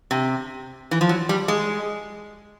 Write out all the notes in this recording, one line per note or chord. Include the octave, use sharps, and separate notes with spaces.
C3
E3
F3
F#3
G3
G#3